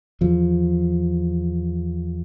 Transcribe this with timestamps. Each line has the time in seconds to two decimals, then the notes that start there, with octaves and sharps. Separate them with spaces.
0.21 E2 F3